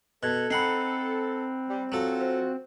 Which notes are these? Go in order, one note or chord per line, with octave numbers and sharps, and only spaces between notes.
B2 A4 F#6 G#6
C4 D#4 F#5 B5 F#6 C7
G3
F#3 F4 F#4 A4
C5